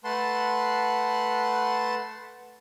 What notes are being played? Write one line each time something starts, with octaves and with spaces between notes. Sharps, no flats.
A3 B4 F#5 A5 C6